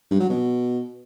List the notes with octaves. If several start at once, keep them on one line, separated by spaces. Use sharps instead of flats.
G2
F#3
B2